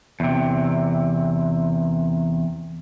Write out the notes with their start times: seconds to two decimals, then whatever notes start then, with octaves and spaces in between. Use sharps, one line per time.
0.20 E2 C3